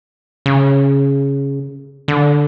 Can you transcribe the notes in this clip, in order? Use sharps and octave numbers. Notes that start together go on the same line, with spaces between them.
C#3
D3